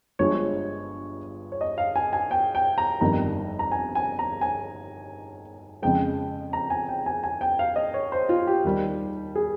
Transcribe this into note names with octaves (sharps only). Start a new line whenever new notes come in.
G1 G2 F3 G#3 C#5
C#5
D#5
F5
G#5
G#5
G5
G5
A#5
G1 F2 D#3 G3 A#5
A#5
G#5
G#5
A#5
G#5
F2 C#3 G#3 G5
A#5
G#5
G5
G#5
G#5
G5
F5
D#5
C#5
C5
F4
G4
D#2 D#3 G3
G#4